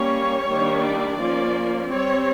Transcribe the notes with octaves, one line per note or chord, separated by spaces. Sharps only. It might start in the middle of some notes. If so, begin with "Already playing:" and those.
Already playing: G3 A#3 C#4 C#5
D#3 G3 A#3 D4
D5
F3 A#3 C#4
G3 C4 C#5